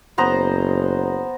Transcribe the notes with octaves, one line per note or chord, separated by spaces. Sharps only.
F#1 B3 C5 A#5